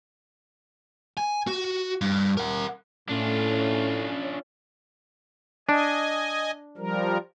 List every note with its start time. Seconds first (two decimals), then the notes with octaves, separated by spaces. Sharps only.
1.17 G#5
1.47 F#4
2.01 G2
2.37 A#4 F#5
3.09 A2 C#4 D4 F4
5.69 D4 D#5 G#5
6.77 F3 G3 A#4